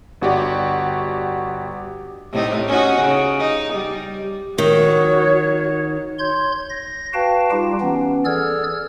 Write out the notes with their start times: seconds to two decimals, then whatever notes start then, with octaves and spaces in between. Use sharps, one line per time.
0.21 G1 F#4 G4 D5
2.33 A2 C3 D#4
2.67 C#4 D#4 F#4
2.99 C#3
3.39 D#4
3.72 G3
4.58 D#3 F#4 C#5
6.19 C#5 C6 G6 G#6
6.69 A#6
7.14 F#4 B4 F5 G5 A5
7.51 G3 D#4 F4 G4
7.81 E3 B3 C#4
8.25 G#4 A4 D5 E6 F6 G#6